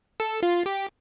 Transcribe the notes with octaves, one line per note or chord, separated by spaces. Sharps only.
A4
F4
G4